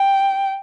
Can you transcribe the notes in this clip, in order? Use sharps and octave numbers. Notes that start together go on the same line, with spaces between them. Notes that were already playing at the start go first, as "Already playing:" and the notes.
Already playing: G5